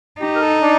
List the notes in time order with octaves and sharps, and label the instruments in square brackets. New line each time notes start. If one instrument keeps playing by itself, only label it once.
[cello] D#4 [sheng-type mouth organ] G4
[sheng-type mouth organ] A#4
A4
D4